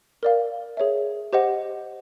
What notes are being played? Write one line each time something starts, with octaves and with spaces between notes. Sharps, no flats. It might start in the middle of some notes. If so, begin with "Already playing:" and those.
A#4 D5 F5
G#4 C#5 E5
G4 C5 D#5 F#5